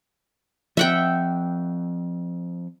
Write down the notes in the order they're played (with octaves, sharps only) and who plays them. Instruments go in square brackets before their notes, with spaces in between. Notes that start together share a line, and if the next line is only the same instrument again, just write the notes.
[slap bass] F3 C4 [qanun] E5 F#5 G5